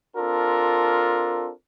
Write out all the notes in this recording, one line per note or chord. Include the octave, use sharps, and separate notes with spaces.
C4 D4 F4 A4 A#4